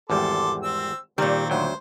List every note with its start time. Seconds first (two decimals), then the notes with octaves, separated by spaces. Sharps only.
0.10 G#1 E2 G3 A4 C6 D6
0.63 C4 E6
1.18 A#2 D#3 G3 C4 D5
1.50 D2 F#3 C5 G5